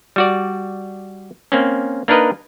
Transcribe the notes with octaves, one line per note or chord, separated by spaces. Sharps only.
G3 F#4 D5
A#3 C4 C#4
A#3 D4 D#4 A#4 B4 D#5